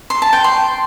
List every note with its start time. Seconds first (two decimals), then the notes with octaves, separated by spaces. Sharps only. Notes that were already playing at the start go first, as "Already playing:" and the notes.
0.10 C6
0.22 A5
0.33 G5
0.44 C6